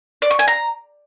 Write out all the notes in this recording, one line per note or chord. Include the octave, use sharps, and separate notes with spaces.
D5
C#6
G#5
A#5